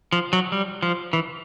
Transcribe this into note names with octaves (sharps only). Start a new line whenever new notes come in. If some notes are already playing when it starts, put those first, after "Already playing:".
F3
F#3
G3
F3
E3